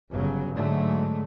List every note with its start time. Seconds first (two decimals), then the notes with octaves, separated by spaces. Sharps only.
0.12 G1 C#3 F#3
0.55 G#2 D3 F#3 G#3 A3